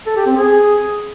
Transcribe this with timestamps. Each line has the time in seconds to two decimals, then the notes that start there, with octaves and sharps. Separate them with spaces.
0.06 A4
0.16 G4
0.26 C4
0.36 G#4